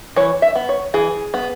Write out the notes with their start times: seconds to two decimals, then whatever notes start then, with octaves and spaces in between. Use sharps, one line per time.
0.16 E3 C#5
0.42 E5
0.55 B3
0.69 C#5
0.94 E3 G#4
1.34 B3